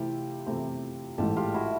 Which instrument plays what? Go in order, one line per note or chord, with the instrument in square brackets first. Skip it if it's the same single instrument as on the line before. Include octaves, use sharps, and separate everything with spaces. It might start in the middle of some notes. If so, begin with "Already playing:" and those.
Already playing: [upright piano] C3 E3 A3 C4 E4 [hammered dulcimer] F4 G4
[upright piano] C3 E3 A3 C4 E4
[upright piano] A1 G#2 E3 A3 [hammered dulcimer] G4 A4
[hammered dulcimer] F4 G4
E4 F#4